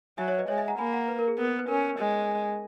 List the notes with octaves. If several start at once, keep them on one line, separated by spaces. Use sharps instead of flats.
F#3 E5 G#5
C#5 E5
B4 D#5
G#3 C#5 E5
E5 G#5
F#5 A#5
A#3 G#5 B5
F#5 A#5
B4
A#4
G#4
B3 A#4
B4
B4
C#4 A#4
G#3